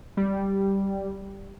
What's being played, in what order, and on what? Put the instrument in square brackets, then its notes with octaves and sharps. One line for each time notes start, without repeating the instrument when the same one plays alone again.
[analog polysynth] G3